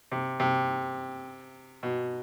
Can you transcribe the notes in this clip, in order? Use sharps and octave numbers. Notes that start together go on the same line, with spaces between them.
C3
C3
B2